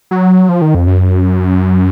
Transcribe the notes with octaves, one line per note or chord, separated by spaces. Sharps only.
F#3
F3
D#3
F2
F#2